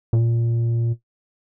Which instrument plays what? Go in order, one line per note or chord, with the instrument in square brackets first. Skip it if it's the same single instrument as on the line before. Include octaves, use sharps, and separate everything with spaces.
[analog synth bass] A#2